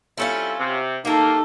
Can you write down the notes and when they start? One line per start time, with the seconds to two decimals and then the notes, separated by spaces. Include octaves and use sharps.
0.18 G3 C4 C#4 E4 F4 A4
0.59 C3
1.05 A3 A#3 D#4 G4 A4